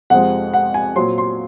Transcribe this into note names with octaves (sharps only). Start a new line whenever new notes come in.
F2 C3 F3 G#3 C4 F#5
F#5
G#5
A#2 F#3 C4 C6
C6